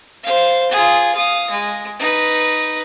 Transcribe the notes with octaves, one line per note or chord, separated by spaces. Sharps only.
C5 F5
F4 G#4
F5 D#6
G#3
D#4 B4